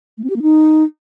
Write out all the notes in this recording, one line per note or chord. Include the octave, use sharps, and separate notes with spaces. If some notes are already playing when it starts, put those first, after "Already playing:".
A3
C4
G4
A#3
D#4